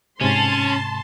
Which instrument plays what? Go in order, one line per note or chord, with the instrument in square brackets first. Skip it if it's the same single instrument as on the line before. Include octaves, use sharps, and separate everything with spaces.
[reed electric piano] G#2 C3 [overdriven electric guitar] C#4 [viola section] A5 C6